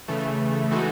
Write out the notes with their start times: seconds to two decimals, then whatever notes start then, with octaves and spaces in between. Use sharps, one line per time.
0.08 C#3 E3 A3
0.71 E3 G#3 D#4 F#4 A4